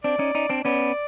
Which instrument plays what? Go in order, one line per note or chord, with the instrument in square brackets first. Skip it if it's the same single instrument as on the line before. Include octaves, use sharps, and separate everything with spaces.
[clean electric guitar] C4 D4 [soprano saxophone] D5
[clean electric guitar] C#4 D#4
C#4 D#4
C4 D4
[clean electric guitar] B3 C#4 [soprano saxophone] D5